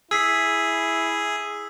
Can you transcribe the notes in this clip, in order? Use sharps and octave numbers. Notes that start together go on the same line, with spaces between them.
E4 G#4 E6 B6 C7